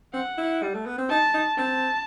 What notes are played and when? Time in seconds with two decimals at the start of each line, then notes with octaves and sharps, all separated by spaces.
0.14 C4 F#5
0.38 E4
0.63 G3
0.74 A3
0.86 B3
0.98 C4
1.10 D#4 A5
1.34 D#4
1.58 C4 A5